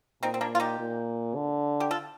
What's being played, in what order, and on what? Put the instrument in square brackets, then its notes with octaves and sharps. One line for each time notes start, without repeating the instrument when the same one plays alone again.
[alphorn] A#2 [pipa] C4 D#4
[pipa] C4
A#3 D4
F4
D#4 G4
[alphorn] A#2
D3
[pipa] G4
F4 A4